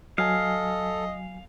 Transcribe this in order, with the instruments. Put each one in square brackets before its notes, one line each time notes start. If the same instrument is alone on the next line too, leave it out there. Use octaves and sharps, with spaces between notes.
[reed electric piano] F#3 G#5 [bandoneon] A4 [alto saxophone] D#5 [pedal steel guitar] F5